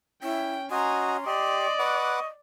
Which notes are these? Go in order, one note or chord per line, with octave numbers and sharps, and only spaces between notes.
C#4 E4 G5
C#4 F#4 D#5 G#5 A#5 C6
G4 D5 D#5
B4 F#5 C#6 D6